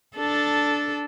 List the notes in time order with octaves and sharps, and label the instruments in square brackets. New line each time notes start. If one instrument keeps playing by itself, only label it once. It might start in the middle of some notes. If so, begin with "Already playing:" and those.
[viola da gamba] D4 A4